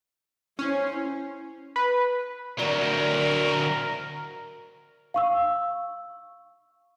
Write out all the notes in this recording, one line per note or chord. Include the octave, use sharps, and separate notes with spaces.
C#4 E4 C5
B4
D2 F#3 A#4 D5
F5 C#6 E6